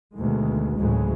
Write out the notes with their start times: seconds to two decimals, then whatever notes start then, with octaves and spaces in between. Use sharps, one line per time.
0.15 D2 B2 D#3 G#3
0.77 D2 A2 C#3 E3 F#3 G#3